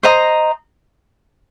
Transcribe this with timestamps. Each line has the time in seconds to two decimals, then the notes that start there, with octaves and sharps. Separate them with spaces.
0.03 C5 D#5 A#5 D#6